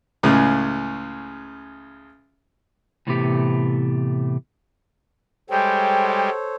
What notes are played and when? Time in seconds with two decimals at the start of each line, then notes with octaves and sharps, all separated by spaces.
0.23 C#2 A2 C#3
3.07 A2 C3 E3 A3 B3 G4
5.50 G3 G#3 A4 C5 C#5 G5